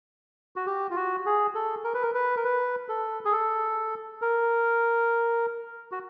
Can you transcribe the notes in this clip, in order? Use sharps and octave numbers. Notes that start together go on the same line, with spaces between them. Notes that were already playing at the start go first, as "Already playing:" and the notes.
F#4
G4
F4
F#4
G#4
A4
A#4
B4
A#4
B4
A#4
B4
A4
G#4
A4
A#4
F#4